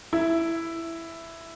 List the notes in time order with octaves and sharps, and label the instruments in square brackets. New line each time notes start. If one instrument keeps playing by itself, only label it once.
[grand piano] E4